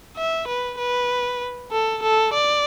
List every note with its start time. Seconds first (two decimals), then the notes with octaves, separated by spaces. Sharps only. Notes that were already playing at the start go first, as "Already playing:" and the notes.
0.17 E5
0.48 B4
0.78 B4
1.72 A4
2.02 A4
2.34 D5